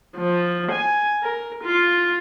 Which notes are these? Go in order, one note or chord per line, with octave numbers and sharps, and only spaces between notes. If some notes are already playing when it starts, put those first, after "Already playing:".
F3
G#5
A#4
F4